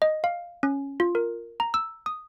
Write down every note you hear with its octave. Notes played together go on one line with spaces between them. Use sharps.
D#5
F5
C#4
F4
A#4
A#5
E6
D#6